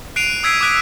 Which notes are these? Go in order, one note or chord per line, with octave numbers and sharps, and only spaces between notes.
F#6 C7 D7 D#7 F7
D#6 E6 G#6 B6 C7 D7
D6 D#6 F#6 B6 D7